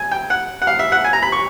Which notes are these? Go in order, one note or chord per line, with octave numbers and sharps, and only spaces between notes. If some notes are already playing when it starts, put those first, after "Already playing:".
Already playing: G#5
G5
F#5
F#5
F5
E5
F#5
G#5
A#5
B5
C#6